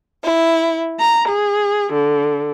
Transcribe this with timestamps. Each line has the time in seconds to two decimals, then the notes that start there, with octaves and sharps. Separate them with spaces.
0.24 E4
1.00 A#5
1.30 G#4
1.93 D3